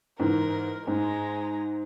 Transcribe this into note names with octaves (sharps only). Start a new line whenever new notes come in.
G#2 E3 A#4
G#2 G#3 A#5